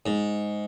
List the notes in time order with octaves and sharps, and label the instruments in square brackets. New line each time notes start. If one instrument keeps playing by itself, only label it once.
[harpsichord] G#2